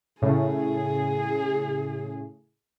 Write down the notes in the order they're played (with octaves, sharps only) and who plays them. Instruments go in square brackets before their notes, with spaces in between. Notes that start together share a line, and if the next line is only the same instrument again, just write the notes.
[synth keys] A2 C#3 [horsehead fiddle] G#4